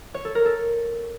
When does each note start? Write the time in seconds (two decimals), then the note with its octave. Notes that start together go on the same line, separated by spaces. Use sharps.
0.14 C#5
0.25 A4
0.35 A#4
0.45 A4